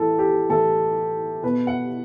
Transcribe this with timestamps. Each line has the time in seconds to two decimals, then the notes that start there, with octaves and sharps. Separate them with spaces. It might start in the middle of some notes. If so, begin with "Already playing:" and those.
Already playing: A2 E3 A4
0.19 G4
0.49 A2 E3 A4
1.43 B2 B4
1.67 F#5